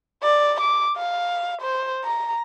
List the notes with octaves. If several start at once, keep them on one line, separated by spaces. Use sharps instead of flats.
D5
D6
F5
C5
A#5